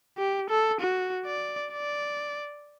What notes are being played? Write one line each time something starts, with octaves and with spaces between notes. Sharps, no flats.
G4
A4
F#4
D5
D5